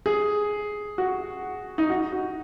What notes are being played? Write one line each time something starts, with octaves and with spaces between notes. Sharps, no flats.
G#4
F#4
D#4
F#4
F#4